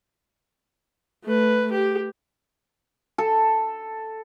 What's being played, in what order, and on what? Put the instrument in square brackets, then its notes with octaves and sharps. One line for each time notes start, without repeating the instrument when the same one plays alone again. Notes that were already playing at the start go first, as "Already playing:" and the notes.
[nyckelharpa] A3 B4
G4
[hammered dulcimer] A4